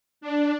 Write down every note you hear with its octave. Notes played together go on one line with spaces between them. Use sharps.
D4